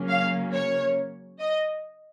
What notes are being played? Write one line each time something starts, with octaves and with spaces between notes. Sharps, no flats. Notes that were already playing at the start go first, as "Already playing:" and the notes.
Already playing: C#3 F#3 A#3 C#4
F5
C#5
D#5